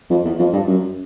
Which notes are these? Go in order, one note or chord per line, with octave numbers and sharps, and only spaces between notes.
F2
E2
F2
G2
F#2